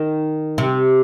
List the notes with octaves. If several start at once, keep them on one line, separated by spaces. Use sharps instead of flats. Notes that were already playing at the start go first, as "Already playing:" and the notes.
Already playing: D#3
C3